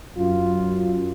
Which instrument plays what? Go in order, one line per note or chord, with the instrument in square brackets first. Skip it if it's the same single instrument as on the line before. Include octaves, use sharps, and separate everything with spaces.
[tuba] F#2 [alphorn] F4